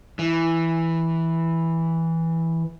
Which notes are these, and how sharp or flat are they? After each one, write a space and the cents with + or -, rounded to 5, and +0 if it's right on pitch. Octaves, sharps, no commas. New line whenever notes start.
E3 -5